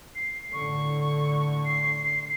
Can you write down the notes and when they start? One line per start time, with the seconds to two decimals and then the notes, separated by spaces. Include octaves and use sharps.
0.15 C7
0.53 A2 D3 C#6
1.65 C7